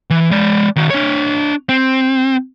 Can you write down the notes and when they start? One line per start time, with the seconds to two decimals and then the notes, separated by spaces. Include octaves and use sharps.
0.10 E3
0.31 G#3 D5
0.76 D#3 F#4
0.90 D4 C#5
1.69 C4